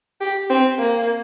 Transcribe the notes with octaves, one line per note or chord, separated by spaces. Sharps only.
G4
C4
A#3